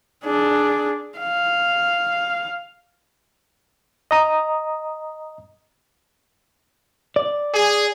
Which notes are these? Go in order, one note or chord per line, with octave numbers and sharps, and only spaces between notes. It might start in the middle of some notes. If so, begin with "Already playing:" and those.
D4 G#4
F5
D#5 A#5 D#6
D5
G#4